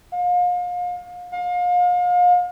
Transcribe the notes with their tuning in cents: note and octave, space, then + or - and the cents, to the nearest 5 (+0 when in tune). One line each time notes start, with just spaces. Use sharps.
F5 +35
F5 +35